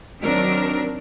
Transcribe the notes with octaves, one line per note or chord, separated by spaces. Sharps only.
D#3 F#3 C4 D4 A#4